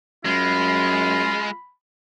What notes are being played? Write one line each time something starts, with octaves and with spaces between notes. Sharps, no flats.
F#2 G#3 F4 B5